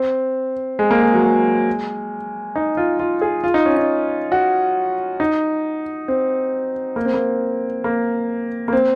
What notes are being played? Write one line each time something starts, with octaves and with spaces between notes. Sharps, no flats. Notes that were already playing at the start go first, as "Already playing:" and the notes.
Already playing: C4
G#3
A#3
G#3
F#3
G#3
D#4
F4
F4
G#4
F4
D#4
C#4
D#4
F#4
D#4
C4
A#3
C4
A#3
A#3
A#3
C4